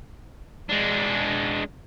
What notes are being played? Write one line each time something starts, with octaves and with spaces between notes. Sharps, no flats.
G#3 D4